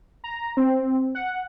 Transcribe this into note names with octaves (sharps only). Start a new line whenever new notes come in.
A#5
C4
F#5